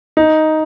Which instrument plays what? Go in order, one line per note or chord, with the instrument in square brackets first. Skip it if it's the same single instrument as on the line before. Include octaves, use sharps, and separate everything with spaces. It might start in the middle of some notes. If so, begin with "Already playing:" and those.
[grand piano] D#4